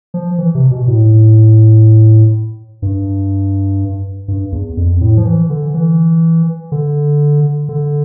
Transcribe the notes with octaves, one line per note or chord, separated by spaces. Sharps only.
F3
E3
C3
B2
A2
G2
G2
E2
F2
A2
F3
E3
D3
E3
D3
D3